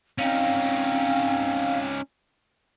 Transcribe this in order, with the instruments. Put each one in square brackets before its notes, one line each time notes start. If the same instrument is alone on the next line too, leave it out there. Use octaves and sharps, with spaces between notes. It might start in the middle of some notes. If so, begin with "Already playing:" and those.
[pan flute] C4 [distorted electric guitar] C#4 D#4 [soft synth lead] F5